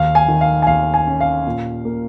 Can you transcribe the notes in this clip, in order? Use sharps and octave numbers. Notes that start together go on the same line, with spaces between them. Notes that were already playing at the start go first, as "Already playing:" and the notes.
Already playing: D#2 F5
G#5
D#3
F5
G#5
D#2 F5
G#5
C#4
F5
A#2
A#3